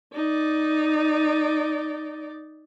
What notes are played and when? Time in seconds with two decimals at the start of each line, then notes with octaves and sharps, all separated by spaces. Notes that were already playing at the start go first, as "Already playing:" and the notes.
0.15 D#4 D5